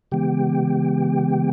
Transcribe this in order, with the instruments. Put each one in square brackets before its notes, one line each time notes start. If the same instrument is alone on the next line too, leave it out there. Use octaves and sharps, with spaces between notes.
[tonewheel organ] C#3 E3 G#3 B3 G4 G5